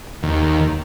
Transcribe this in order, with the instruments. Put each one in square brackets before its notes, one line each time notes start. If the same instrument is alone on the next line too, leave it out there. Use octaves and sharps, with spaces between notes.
[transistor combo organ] D#2